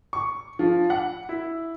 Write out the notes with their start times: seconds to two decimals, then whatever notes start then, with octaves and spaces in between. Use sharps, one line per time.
0.13 C#6
0.59 F3
0.90 F#5
1.29 E4